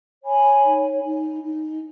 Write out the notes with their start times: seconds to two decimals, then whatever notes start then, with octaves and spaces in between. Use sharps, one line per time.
0.23 C#5 G#5 B5
0.64 D#4
1.03 D#4
1.43 D#4